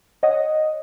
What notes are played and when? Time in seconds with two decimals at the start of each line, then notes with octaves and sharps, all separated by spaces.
0.23 C#5 D#5 F#5 D#6